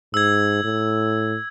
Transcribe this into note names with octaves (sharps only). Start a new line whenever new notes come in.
G#2 E6 G#6
A2